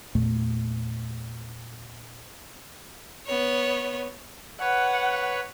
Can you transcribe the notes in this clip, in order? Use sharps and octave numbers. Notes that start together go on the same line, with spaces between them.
E2 A#2 A3
B3 C#5
B4 C#5 F#5